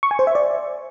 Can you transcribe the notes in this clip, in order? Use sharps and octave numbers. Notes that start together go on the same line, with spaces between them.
C#6
G#5
C5
E5
D5